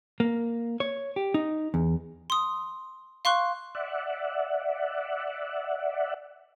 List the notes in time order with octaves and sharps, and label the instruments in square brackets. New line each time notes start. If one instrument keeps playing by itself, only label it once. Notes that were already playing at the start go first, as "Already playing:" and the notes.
[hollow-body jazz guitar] A#3
C#5
G4
D#4
E2
[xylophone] C6 D#6
F5 C6 C#6 F#6
[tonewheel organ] D5 E5 F#5